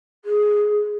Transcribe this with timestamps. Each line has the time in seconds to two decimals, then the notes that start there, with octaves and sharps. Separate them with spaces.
0.24 G#4